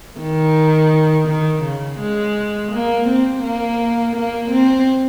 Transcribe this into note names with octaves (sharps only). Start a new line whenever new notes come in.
D#3
D#3
C#3
G#3
A#3
C4
A#3
A#3
C4